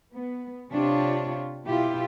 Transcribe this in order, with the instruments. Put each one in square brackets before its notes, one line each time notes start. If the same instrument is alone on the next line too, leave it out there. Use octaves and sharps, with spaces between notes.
[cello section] B3
C3 D4 F4 G4 C#5
B2 E4 F4 G4